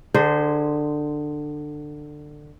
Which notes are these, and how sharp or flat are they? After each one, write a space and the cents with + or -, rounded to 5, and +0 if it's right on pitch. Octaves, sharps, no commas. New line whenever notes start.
D3 +20 G#4 +0 C5 -15